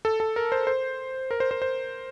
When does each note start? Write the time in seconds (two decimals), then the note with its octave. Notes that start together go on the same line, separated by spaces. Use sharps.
0.05 A4
0.20 A4
0.36 A#4
0.52 C5
0.67 C5
1.31 A#4
1.40 C5
1.51 C5
1.62 C5